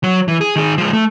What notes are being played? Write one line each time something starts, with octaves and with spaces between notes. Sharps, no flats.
F#3
E3
G#4
D#3 G#4
F3 G#3
A3